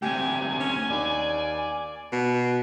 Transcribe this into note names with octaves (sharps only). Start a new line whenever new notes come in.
D2 C3 G4 G#5
C#4
D#2 D5
B2